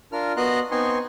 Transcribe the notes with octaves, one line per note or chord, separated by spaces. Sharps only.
D4 F4 A#4 F6
B3 F#4 D#5 A#5 C6 F#6
B3 C4 D#4 G#5 C6 C#6